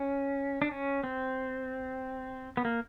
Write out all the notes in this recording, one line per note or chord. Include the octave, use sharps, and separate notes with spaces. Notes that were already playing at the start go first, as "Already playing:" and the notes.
Already playing: C#4
D4
C#4
C4
B3
A#3